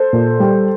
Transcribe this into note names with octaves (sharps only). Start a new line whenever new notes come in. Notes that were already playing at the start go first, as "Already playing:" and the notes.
Already playing: A4 C5
A#2
G3